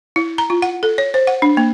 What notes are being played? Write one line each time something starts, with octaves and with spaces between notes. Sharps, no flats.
E4
A#5
F4
F#5
A4
C#5
C5
F#5
D4
A#3